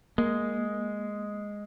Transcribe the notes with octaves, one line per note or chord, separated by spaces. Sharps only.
G#3 A#3